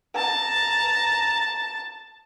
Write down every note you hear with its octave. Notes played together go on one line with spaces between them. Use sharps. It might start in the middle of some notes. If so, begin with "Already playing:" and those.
A5 A#5